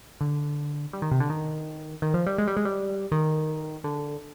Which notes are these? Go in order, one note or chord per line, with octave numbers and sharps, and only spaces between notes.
D3
G3
D#3
C3
D3
D#3
D#3
F3
G3
G#3
G3
G#3
G3
D#3
D3